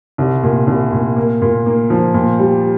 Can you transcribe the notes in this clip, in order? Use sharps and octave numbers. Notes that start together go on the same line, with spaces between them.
C2
A#2
C2
A#2
A#3
A#2
A#3
F3
A#2
G3